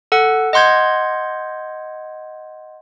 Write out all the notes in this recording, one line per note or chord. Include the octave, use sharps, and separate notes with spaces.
A4 F#5
D#5 F#5 C6 G6 G#6